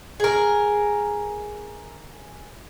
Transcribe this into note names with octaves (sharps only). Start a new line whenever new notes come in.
G#4 A#4